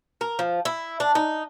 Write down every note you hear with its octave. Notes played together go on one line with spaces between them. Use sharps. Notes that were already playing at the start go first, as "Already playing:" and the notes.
A#4
F3
E4
D4
D#4